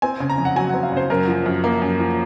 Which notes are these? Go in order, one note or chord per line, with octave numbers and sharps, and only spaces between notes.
C4 G#5
C#3
A#5
F2
F#5
F#3 G#5
C4 F#5
F5
C#3 C5
F#2 A#4
F3
F#2
A#3
F#2
F3